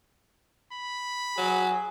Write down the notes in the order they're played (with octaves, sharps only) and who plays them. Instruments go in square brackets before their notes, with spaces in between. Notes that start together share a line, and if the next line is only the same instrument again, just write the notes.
[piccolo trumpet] B5
[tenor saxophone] F#3 [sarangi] G#4